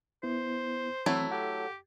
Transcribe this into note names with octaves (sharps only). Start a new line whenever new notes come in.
B3 E4 C5
E3 F#3 A3 C4 E4
G4 A4 F#5